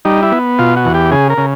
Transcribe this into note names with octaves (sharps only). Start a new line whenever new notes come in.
G3 D#4
E4
B3
B2 F4
F#4
E2
G4
C#3 G#4
A#4
C#3